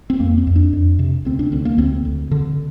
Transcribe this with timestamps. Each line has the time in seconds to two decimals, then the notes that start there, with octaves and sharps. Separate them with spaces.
0.10 C4
0.20 F2 A#3
0.38 C4
0.47 F2
0.56 D4
0.73 F2
0.99 C3
1.25 D2 C4
1.39 D4
1.52 D2 C4
1.65 A#3
1.78 D2 C4
2.05 D2
2.31 D3